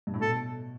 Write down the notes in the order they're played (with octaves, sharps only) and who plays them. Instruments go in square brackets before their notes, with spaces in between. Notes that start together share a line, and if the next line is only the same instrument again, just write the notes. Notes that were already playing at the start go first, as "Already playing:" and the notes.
[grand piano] G2
A2
[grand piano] B2 [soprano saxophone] A4